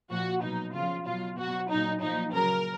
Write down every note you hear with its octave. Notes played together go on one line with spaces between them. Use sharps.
A#2 F3 F#4
B2 F#3 D#4
C#3 F3 F4
B2 F#3 F4
B2 F#3 F#4
A#2 F#3 D#4
A#2 F3 D#4
C#3 F#3 A#4